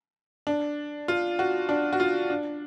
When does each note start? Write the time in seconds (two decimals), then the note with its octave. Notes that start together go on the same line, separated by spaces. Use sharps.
0.47 D4
1.08 F4
1.39 F#4
1.69 D4
1.93 F#4
2.00 F4
2.30 D4